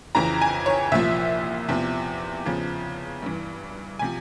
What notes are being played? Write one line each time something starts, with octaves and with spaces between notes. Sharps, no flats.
F2 C#3 E3 A#5
G#5
C#5
C2 A#2 F3 E5
E2 C3 F3
E2 C#3 F3
G2 E3
C3 F3 G#5